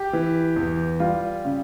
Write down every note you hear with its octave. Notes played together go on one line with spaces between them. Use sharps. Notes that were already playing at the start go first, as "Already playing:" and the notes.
Already playing: G4
E3
E2
G3 F4
C#3